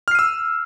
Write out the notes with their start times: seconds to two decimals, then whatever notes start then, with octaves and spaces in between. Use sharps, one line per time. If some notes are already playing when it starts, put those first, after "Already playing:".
0.08 F6
0.11 C7
0.15 D#7
0.19 E6